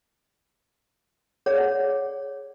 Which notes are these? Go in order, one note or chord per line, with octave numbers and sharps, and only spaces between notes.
G#4 C#5 D5 F#5